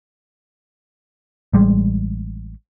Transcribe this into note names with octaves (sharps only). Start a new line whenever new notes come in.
A1 G3 G#3